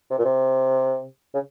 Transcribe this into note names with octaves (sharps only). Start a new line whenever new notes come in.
C3
A#2
C3
C#3